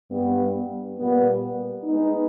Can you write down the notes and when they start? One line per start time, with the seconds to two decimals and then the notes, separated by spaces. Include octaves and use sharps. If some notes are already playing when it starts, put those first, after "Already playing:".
0.10 G2 G3 B3
0.98 A#2 G3 B3
1.84 G#3 B3 D#4